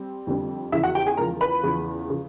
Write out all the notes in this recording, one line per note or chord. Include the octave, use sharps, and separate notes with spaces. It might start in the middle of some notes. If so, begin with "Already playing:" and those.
Already playing: G3 C4
F2 D3 G3 C4
E2 C#3 F3 E4 E5
F#4 F#5
G4 G5
G#4 G#5
E2 C#3 F3 A#4 A#5
B4 B5
E2 C#3 F3
C#3 F3